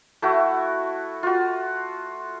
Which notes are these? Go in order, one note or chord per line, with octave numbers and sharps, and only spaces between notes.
A3 E4 F#4
F4 F#4